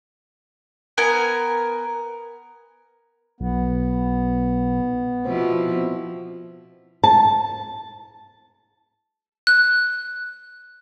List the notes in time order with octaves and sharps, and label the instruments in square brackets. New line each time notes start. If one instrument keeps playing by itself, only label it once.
[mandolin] B3 A#4 G#5
[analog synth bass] B1 [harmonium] B3
[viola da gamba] B2 F3 E4 [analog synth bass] C4
[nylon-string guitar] A5
[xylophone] F#6